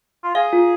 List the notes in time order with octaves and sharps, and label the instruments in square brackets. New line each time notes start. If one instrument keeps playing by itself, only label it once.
[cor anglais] F4
[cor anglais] G#4 [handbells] F5
[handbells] F4